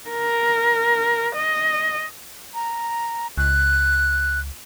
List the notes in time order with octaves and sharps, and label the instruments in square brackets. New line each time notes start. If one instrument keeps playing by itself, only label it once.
[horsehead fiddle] A#4
D#5
[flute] A#5
[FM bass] C#2 [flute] F#6